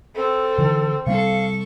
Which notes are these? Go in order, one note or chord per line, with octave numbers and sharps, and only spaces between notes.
C4 A4
D3 E3
C3 G3 C4 A4 F5 C#6